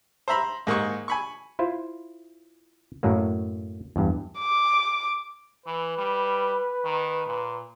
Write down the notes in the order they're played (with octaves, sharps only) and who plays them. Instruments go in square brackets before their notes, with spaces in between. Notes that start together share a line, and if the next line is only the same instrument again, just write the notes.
[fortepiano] C5 E5 A#5 B5
G#2 A#3 D#5 C#6
G#5 B5 C#6
[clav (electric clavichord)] E4 F4 C5
F#2 A2 F#3 A#3
E2 G2
[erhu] D6
[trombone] E3 [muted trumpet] B4
[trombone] G3
D#3
A#2